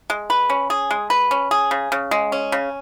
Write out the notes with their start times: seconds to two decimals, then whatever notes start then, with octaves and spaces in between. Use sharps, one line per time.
0.10 G#3
0.30 B4
0.50 C#4
0.70 G#4
0.91 G#3
1.10 B4
1.31 C#4
1.51 G#4
1.71 C#3
1.92 C#3
2.11 G#3
2.32 C#4
2.52 C#3